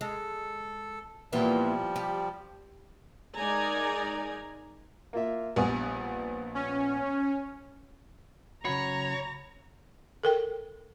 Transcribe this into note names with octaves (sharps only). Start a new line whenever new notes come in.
G#3 A4
A#2 E3 F3 G3 B3
G4
G#3 D#4 A#4 D5 G#5 A#5
A#3 F4 E5
A#1 G3 B3 G#5
C#4
C#3 F#3 F#4 C#5 A#5 B5
A4 A#4 G5